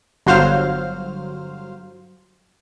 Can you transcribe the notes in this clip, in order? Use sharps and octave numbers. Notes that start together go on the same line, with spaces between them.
G1 F#3 C5 F5 F6